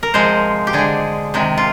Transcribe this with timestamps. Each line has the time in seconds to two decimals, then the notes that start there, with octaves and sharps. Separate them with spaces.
0.03 A#4
0.14 C3 F3 G#3 C5
0.67 G4
0.73 D3 G#3 G#4
1.34 C3 D#3 G#3
1.57 F4